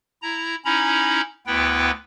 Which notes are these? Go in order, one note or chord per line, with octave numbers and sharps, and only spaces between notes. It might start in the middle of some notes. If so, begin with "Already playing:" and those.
E4 A#5
C#4 D#4 E4 A#5 B5
D2 B3 E4 B4 G5